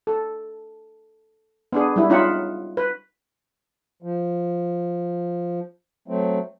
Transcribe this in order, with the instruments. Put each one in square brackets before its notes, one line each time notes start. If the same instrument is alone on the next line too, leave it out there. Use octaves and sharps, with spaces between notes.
[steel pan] A4
B3 D4 G#4
G3 E4
C#4 D#4 F4 E5 F#5
B4
[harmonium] F3
F#3 A3 C4